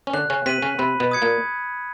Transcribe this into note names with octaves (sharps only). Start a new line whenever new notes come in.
C#4
D3 D4 F#6
C#3 C#4
C3 C4 B6 D#7 F#7
C#3 C#4
C3 C4 B5
B2 B3
D#6 G#6 C#7
A#2 A#3